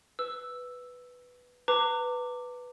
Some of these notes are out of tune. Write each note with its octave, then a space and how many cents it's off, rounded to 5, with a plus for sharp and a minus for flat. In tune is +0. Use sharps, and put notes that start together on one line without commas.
B4 +0 E6 +0
B4 +0 A#5 -40 D6 +0